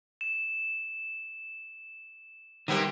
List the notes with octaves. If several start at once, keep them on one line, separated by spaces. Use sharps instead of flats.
E7
C3 D#3 G3 A#3 B3